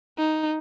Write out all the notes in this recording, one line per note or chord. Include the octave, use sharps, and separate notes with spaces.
D#4